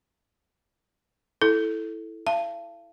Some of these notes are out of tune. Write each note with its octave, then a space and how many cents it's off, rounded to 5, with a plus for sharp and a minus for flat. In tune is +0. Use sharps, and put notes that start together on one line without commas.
E4 +0 A4 -5
F5 -40 A5 +0